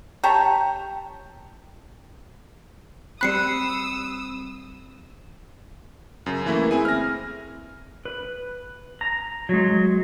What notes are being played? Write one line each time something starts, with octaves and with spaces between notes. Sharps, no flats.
G4 C#5 A5 A#5
G3 C4 B5 D#6 E6 F#6 C7 C#7
F#2 C#3
E3 A3 A#3 E4
C4 E4 G#4 G#5
F6 A#6
B4
A#5
F#3 G#3